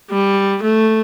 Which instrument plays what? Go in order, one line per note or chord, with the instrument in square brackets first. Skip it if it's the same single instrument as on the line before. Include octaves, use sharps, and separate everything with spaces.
[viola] G3
A3